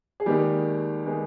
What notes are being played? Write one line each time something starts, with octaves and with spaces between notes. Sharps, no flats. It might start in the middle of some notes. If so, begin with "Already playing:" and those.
G#4
D#2 D#3 G3 G#3 B3 G4
D#3 G#3 B3